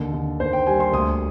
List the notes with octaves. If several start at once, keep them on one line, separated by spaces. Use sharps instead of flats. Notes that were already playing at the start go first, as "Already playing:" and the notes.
Already playing: D#2 D3
D3
D#2 C5
G5
G3 G#5
C6
D2 D#6